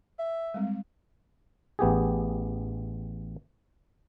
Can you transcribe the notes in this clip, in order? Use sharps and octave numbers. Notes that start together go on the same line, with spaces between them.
E5
G3 G#3 C4
A1 B3 G4 G#4